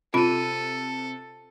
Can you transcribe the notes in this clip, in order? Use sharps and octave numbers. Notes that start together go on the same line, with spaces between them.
C3 F4 A4 B5 D#7